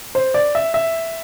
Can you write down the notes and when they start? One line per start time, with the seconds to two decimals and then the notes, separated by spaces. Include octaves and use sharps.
0.15 C5
0.34 D5
0.55 E5
0.74 E5